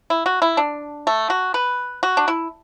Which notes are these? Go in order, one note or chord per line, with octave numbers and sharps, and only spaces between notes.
E4
F#4
E4
D4
A3
F#4
B4
F#4
D4
E4